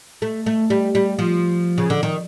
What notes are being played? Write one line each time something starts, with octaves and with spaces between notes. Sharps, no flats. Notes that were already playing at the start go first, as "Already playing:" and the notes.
A3
A3
G3
G3
F3
C#3
D3
D#3